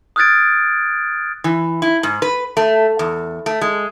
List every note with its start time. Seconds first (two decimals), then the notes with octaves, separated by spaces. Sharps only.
0.16 D#6 F6 F#6 G#6 A6 D7
1.44 E3
1.82 E4
2.03 G#2
2.22 B4
2.57 A3
2.99 E2
3.46 A3
3.61 G#3